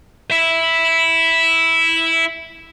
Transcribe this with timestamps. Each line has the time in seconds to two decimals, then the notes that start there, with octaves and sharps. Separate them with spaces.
0.31 E4 E5